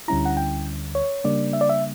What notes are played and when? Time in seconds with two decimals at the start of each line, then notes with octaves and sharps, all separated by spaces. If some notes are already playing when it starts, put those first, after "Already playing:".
0.08 D2 D3 G3 C#4 E4 A#5
0.25 F#5
0.37 G5
0.95 C#5
1.24 C#3 G3 A#3 D4 D5
1.53 E5
1.61 D5
1.69 E5